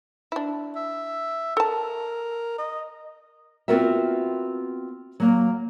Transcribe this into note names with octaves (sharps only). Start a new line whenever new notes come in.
D4 E4
E5
A4 A#4 A5
D#5
B3 C4 F4 F#4 A#4 E5
F#3 A#3